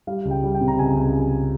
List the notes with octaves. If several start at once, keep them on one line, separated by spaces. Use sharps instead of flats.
G3 F5
C#2
G5
G3
G5
C3
A#5
C#2 G#5
C#2